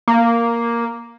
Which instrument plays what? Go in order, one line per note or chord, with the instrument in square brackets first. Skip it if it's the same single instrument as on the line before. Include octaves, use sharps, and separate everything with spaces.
[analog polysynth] A#3